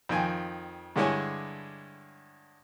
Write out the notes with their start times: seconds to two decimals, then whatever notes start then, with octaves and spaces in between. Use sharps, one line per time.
0.09 F2 D#3 G5 G#5
0.96 G2 D3 G#3 E4 C#5 G#5